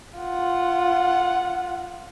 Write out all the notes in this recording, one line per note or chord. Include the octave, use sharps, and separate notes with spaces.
F4 F#5